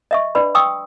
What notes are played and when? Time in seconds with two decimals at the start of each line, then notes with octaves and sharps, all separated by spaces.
0.11 D#5 E5 C#6
0.35 D4 B4 D5 B5
0.55 G5 C6 C#6 D#6 E6